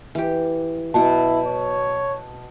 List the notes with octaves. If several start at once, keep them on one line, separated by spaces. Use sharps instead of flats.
E3 G4
B2 F#3 E4 F#5 A5
C#5